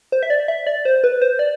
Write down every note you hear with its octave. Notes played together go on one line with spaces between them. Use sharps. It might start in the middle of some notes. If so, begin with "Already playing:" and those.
C5
E5
D5
E5
D5
C5
B4
C5
D5